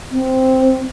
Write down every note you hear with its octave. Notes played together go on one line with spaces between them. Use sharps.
C4